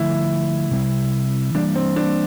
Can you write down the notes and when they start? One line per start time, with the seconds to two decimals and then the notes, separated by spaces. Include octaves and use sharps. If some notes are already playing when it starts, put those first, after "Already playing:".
Already playing: D3 F3 A3 E4
0.71 C3 G3 C4
1.54 E3 G3 A#3 D4
1.75 C4
1.96 D4